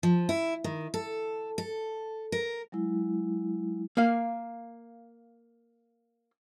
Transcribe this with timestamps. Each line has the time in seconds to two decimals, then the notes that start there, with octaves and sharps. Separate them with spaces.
0.03 F3
0.29 E4
0.64 D#3
0.94 A4
1.58 A4
2.32 A#4
2.72 F#3 G#3 E4
3.97 A#3 F5